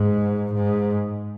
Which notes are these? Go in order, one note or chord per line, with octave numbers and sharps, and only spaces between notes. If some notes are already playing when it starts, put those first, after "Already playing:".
Already playing: G#2
G#2